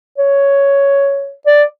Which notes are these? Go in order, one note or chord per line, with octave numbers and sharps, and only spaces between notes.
C#5
D5